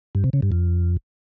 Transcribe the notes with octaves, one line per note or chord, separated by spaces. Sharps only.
G2
C3
C#3
G2
F2